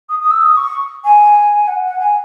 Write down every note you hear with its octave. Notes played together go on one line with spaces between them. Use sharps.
D#6
D#6
E6
D#6
C#6
G#5
F#5
F#5
G#5